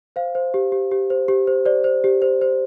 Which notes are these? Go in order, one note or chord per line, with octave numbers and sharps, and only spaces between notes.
C5 F5
C5
G4
G4
G4
C5
G4
C5
C5 D5
C5
G4
C5
C5